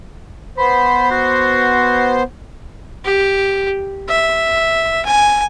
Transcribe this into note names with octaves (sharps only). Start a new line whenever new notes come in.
B3 C5 B5
F#4
G4
E5
G#5